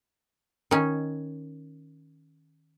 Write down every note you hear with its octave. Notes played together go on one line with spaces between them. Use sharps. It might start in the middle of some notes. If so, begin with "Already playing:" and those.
D#3 C#4